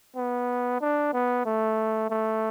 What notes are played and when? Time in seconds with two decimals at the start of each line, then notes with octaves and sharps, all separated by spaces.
0.16 B3
0.81 D4
1.13 B3
1.46 A3
2.10 A3